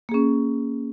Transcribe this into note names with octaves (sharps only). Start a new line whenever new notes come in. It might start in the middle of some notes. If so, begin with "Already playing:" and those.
A#3 C#4 G#4